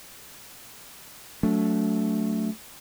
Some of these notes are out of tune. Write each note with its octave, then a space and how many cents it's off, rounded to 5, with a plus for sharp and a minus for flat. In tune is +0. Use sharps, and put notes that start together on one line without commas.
F#3 -5 A3 +0 D4 -30